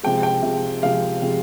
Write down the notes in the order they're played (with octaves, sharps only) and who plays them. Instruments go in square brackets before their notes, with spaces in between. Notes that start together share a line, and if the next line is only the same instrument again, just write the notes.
[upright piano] C3 F3 G#3 G5
G5
C3 F3 G#3
C3 F3 G#3 F5
C3 F3 G#3